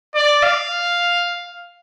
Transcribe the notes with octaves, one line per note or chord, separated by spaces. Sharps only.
D5
F5